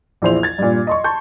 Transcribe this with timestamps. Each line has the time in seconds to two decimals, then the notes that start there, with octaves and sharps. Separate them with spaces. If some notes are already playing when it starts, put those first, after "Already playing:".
0.22 A#1 E2 E4 C5 C6 F7
0.43 G#6 A6
0.58 G2 A#2
0.87 D#5 C6 C#6
1.04 A5 C6 C#6 G6